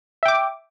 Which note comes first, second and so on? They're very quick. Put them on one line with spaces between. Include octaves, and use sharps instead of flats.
E5 G5 D6